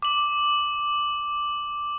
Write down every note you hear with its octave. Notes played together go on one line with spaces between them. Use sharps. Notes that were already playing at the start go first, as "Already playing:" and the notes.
D6 F#7